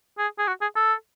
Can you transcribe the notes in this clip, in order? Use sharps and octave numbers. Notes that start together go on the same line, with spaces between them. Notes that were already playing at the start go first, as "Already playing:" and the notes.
G#4
G#4
F#4
G#4
A4